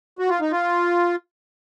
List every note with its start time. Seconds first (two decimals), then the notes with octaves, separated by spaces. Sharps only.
0.19 F#4
0.29 F4
0.41 D#4
0.52 F4